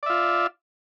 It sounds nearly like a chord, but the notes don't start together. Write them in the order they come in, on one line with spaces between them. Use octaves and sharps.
D5 E5 F4